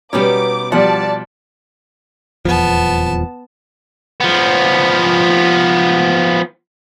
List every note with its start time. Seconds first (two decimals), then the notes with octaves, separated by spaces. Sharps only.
0.13 B2 G3 B3 C#4 D#4 D6
0.72 F3 G3 D5 F#5 A5
2.45 D#1 E2 F3 B3 A5
4.21 F3 B3